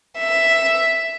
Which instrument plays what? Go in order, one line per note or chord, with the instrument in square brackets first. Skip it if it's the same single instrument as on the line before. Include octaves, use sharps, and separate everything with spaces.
[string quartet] E5